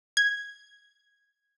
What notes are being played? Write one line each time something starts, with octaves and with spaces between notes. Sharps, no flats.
G#6